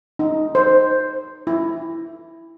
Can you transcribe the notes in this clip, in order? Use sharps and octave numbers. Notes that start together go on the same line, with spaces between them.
D#4
C5
E4